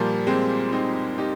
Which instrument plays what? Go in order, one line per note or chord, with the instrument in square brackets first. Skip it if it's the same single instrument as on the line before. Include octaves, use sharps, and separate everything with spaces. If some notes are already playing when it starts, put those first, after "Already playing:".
Already playing: [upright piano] A#2 F3 G3 A#3
G#3 C4
C4 D#4
D#4 G4